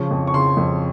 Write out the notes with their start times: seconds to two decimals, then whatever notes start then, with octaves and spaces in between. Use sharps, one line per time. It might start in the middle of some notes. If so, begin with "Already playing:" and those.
Already playing: C#3 F3 C#6
0.11 F2
0.27 C#6
0.34 C#3 C6
0.57 F2